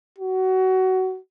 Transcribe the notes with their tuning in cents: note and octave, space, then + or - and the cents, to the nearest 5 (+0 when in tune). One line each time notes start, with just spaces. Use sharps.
F#4 +20